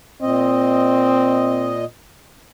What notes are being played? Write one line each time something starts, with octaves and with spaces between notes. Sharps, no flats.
A#2 C4 D#5